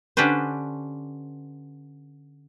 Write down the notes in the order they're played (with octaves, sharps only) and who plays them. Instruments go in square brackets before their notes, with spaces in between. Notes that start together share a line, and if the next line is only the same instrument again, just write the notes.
[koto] D3 C#4 D4 G4 B4 C5